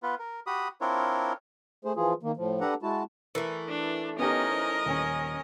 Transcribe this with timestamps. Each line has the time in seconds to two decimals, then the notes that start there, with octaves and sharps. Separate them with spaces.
0.03 B3 F4 B4
0.19 A#4
0.47 F#4 G4 B5 D#6
0.81 C4 D4 E4 F4 A#4 C#5
1.85 A3 G#4 C5
1.96 E3 F3 F4 G#4
2.23 D#3 A#3
2.37 A2 F3
2.61 D4 G4 A4 B4 F#5 A#5
2.83 G#3 E4 F#4 A5
3.35 E3 A3 A#4
3.68 D4
4.19 B3 C#4 D#4 G4 A#4 D#5
4.50 C5
4.86 D#1 C#4 G#5